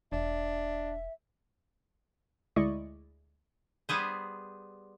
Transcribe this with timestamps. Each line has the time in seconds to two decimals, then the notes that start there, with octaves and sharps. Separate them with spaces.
0.12 E1 D4 E5
2.56 D2 G#3 E4 D5 D#5 C#6
3.89 G3 B3 G#4 C5